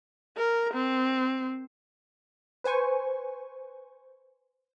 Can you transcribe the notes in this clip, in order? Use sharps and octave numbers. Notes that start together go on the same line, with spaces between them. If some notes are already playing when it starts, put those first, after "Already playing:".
A#4
C4
B4 C5 G#5 C#6